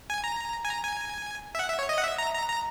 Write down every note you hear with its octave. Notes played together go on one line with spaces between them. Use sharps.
G#5
A#5
G#5
A#5
G#5
E5
F#5
E5
C#5
D#5
F#5
E5
A#5
A#5
A#5